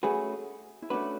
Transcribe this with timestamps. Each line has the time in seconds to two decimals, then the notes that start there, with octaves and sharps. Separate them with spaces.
0.03 A3 C#4 F#4 G#4 B4
0.82 E4
0.90 A3 C#4 D4 F#4 B4